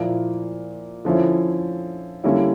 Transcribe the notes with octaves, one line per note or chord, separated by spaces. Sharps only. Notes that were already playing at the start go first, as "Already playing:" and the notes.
Already playing: A#2 F3 A#3 E4
D3 F3 C#4 E4
D3 G3 A#3 C#4 E4